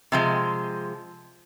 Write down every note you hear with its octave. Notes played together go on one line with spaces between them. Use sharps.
C3 F3 G#3